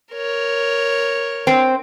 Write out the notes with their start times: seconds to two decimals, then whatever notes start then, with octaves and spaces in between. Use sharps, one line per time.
0.14 A#4 C#5
1.47 C4